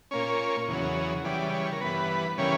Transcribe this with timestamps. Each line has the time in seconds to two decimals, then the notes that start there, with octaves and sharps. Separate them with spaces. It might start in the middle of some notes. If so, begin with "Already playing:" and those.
0.11 A#2 A#3 C#4 C#5
0.68 E2 C#3 F#3
1.24 C#3 E3 G3 D5
1.54 C#5
1.72 A#4
1.81 G2 E3 B3 B4
2.38 C#3 E3 G3 A#3 C#4 C#5